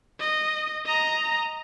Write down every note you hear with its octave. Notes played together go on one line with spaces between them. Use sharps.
D#5
D#5 A#5